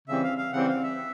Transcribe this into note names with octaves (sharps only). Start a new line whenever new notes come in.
C#3 E3 G3 C4 E5
F5
F5
C#3 E3 G3 C4 F#5
F5
E5